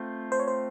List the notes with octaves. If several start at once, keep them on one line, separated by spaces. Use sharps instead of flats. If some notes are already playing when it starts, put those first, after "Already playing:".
Already playing: A3 C4 F4
C5
C#5
C5